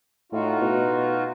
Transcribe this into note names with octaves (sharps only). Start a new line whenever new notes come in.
A2 D#4 F4 F#4
B2